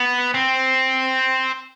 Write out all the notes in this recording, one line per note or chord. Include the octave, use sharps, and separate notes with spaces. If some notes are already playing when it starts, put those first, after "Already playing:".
Already playing: B3
C4